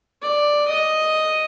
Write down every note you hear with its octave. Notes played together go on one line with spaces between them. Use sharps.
D5
D#5